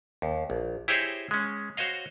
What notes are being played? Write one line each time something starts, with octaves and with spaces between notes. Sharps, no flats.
D#2
A#1
E4 G4 G#4 C5 C#5 D#5
G#3 C#4
F#4 C5 C#5 D#5 F5